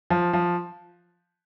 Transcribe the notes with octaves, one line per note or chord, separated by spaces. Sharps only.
F3
F3